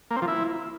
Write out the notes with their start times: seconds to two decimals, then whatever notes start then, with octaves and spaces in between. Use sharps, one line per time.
0.11 A#3
0.16 C4
0.22 F3
0.28 E4